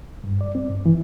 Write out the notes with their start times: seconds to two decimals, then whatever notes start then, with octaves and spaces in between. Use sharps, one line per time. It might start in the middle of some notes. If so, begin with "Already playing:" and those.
0.24 G2
0.41 D5
0.55 C4
0.70 G2
0.86 E3